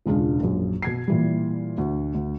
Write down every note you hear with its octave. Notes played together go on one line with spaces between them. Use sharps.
E1 C#2 G#3 D4 F4
A#1 F#2
B2 G#6 C7
A#2 E3 G3
D2
D2